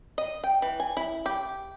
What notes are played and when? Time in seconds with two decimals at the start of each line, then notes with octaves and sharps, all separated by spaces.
0.18 D#5
0.44 G5
0.62 E3
0.80 G#5
0.97 E4
1.26 G4